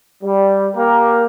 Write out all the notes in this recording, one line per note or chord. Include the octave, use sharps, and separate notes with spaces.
G3
A#3 G4 A#4